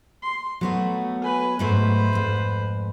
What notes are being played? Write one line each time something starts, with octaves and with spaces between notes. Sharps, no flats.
C6
F#3 A3 B3 F#4
B4 G#5
G#2 F#3 A3 B4 C5
F2 G#2